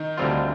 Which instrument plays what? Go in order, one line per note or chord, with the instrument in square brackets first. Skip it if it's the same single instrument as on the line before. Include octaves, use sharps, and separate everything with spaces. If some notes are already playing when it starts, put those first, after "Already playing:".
Already playing: [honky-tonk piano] D#3 D#4
[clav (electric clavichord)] D2 D3 G3 C4 F4